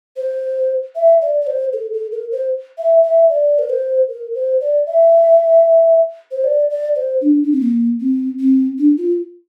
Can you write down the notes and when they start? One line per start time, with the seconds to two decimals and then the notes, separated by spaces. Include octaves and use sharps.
0.16 C5
0.95 E5
1.22 D5
1.41 D5
1.47 C5
1.73 A4
1.93 A4
2.12 A#4
2.32 C5
2.78 E5
3.03 E5
3.29 D5
3.59 A#4
3.69 C5
4.09 A#4
4.35 C5
4.61 D5
4.87 E5
6.31 C5
6.44 D5
6.70 D5
6.95 C5
7.21 D4
7.43 D4
7.52 C4
7.61 A#3
8.00 C4
8.39 C4
8.78 D4
8.97 F4